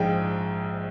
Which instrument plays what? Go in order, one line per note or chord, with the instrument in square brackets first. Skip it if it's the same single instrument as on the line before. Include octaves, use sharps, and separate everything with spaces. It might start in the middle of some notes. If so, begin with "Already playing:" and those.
Already playing: [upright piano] A#1 G#2 F3 G#3 G5